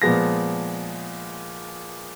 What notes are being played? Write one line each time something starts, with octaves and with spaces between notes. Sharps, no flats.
A#2 F3 G#3 B3 A#6